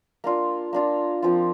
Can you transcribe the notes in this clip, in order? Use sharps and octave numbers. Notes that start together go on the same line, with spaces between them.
A#3 D4 F4
A#3 D4 F4
F3 C4 F4